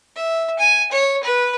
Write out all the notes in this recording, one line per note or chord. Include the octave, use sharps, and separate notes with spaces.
E5
G#5
C#5
B4